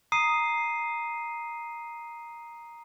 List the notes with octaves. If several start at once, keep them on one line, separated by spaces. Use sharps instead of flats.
A#5 D#6 C7 D#7